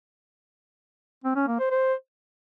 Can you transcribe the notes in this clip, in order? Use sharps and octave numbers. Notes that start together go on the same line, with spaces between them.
C4
C#4
A#3
C5
C5